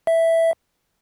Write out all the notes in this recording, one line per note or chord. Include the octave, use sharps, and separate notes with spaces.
E5